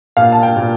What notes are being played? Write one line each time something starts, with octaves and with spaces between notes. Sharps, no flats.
A#2 F5
A5
G5
A#2